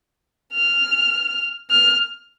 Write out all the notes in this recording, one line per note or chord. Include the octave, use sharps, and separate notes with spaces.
F6
F6